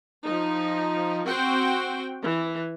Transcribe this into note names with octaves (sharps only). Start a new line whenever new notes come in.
F3 D#4
C4 F#4 C5 G5
E3